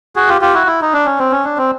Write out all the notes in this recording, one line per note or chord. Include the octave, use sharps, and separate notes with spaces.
F#4 G#4
F4 G4
F4 G4
E4 F#4
E4
D#4
D4
C#4
C4
C#4
D4
C4